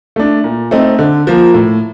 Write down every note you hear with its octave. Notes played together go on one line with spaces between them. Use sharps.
A3 D4
A#2
A3 C4 D#4
D3
F3 A#3
A2